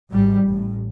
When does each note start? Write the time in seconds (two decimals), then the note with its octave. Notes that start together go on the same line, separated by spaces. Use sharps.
0.10 G#1 G#2 G3
0.46 A1 A2